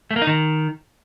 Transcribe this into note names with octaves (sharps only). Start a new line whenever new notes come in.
A3
A#3
D#4
D#3